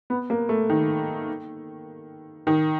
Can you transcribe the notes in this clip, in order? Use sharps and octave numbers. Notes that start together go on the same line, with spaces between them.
B3
A#3
A3
D#3
D#3